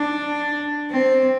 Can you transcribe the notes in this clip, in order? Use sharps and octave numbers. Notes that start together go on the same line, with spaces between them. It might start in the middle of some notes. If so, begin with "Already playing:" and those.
Already playing: D4
C4